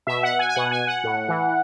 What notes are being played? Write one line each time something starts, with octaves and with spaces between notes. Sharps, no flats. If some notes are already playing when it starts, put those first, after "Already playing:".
B2 E5
F#5
G#5
G#5
B2 F#5
G#5
F#5
A2
E3